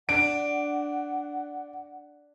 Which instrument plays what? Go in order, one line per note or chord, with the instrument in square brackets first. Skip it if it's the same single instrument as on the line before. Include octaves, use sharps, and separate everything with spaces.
[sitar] D4 [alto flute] F#5 [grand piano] D7